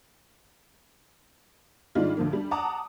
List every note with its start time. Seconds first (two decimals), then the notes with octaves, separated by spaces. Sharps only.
1.95 G#2 D#3 G3 G#3 D4 F4
2.17 D2 F3 A#3
2.33 G3 D4
2.51 F#5 A5 A#5 D6 D#6